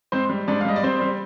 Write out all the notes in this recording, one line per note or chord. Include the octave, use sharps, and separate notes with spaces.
G#2 C4 C5
G3
G#2 D4 D5
F5
G3 D#5
D5
G3 C4 C5
G3